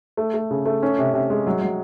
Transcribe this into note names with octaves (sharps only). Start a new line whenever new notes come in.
A3
A3
C#3
A3
C#4
C3
C3
G#3
F#3
F#3